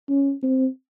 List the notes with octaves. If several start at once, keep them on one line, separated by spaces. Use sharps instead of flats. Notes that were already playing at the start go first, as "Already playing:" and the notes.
C#4
C4